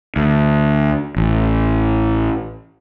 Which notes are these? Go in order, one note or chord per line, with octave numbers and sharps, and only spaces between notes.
D2
A1